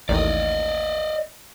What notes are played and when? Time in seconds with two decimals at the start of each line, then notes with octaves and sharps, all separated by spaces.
0.09 A1 D#2 D5 D#5